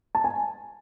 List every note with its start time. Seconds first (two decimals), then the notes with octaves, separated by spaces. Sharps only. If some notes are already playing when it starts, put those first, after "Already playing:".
0.15 A5
0.24 G#5